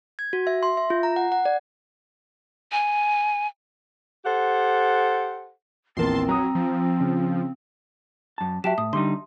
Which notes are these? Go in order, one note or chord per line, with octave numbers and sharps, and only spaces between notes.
G#6
F#4
E5
C6
E5
F4
A#5
F#5
F#5
D5
G#5
G4 A4 C5 F#5
A#1 E2 C4 A#4 A5 C6
F#3 A#5 D#6
F3
C#3
F#2 A5
F#3 G4 E5 A5 E7
A2 D#6
D3 G3 D#4 C6